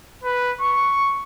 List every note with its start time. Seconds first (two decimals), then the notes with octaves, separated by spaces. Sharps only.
0.24 B4
0.61 C#6